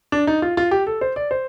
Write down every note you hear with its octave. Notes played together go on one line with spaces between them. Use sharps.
D4
D#4
F4
F4
G4
A4
C5
D5
C5